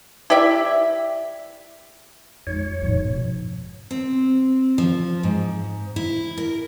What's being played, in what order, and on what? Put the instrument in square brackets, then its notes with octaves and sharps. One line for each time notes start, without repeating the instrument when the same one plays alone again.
[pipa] E4 G4 D5 E5
[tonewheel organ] F2 C#5 [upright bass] G#3 D#4
[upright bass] G#2 F3
[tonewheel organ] B2
[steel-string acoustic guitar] C4
F3
G#2
E4
A#4